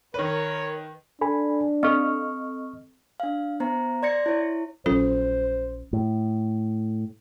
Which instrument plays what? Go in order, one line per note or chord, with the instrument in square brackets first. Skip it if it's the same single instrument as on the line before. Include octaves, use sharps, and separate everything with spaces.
[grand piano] D#3 B4 [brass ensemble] A#4 C#5
[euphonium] D4 [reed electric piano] A4 G#5 B5
[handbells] C4 A4 [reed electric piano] D#5 C#6 F6
[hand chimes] D4 F5
B3 C5 A#5
D5 C6 G#6 A#6 C#7
E4 C#5
[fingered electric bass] A#1 F#3 [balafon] C#4 F4 A4 [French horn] C5
[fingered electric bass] A2